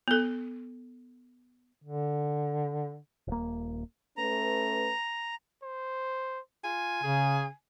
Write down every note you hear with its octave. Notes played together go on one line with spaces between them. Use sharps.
B3 A4
D3
D#1 A#3
A3 C#4 B4 A#5
C5
F4 G#5
C#3 G#4